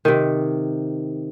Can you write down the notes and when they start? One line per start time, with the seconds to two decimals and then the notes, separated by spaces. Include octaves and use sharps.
0.05 C3 D#3